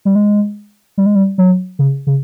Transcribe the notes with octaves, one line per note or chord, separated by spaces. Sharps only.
G3
G#3
G3
G#3
G3
F#3
C#3
C#3